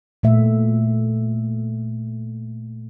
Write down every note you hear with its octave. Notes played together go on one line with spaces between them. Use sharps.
A#2 A3 E5